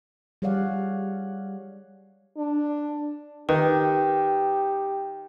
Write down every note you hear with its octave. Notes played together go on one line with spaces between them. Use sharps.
G3 G#4 C#5 D5 F5 F#5
D4
D#3 G4 B4